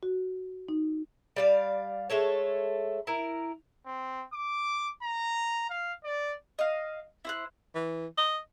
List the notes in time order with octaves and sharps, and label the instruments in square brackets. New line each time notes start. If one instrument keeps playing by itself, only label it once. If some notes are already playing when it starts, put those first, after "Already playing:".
[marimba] F#4
D#4
[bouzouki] G3 D5 F5
G#3 A3 A4 C#5
E4 A#4
[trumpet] C4
D6
A#5
F5
D5
[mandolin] D#5 F5
E4 C5 F#6
[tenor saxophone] E3
D#5